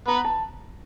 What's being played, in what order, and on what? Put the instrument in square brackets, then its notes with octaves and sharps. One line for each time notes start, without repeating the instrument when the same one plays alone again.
[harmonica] B3 B4 [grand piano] A#5
[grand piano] A5